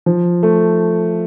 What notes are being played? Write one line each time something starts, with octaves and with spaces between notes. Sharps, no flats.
F3
A3